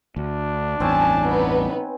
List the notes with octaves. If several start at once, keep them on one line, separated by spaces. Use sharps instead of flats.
D2 D4
A1 E2 G2 C4 C#4 G#5 A5
B3 D#4 B4